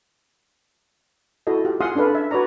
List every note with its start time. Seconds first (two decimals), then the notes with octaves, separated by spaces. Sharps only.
1.47 E4 F#4 A4 D#5
1.65 F4 G4
1.80 F4 G#4 F5 F#5 C6 D#6
1.96 C#4 D4 A4 B4 F5
2.15 E5
2.31 F#4 B4 C#5 D5 A#5